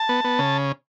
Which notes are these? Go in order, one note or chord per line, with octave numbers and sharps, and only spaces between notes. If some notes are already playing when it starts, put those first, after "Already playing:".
Already playing: A5
B3
B3
C#3